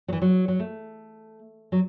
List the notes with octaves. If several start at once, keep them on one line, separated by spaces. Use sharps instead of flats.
F#3
E3
F#3
F#3
A3
F#3